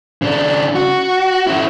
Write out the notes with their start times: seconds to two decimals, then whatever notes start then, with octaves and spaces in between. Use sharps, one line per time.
0.22 C#3 D4
0.75 F#4
1.47 C#4 E4